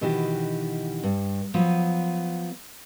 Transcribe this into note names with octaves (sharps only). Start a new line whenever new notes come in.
B2 D#3 E3 F#4 G4
G2
F3 F#3 B3